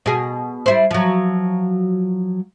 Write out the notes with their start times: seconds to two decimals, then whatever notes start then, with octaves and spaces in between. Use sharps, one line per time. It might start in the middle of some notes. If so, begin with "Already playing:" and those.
0.06 B2 G#4
0.66 G3 E4 C5
0.91 F3 F#3